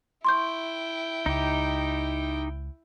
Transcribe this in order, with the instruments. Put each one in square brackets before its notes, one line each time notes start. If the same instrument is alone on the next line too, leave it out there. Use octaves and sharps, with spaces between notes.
[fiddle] E4 G5 [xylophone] C6 C#6 G6
[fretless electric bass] C#2 [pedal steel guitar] D#4 G4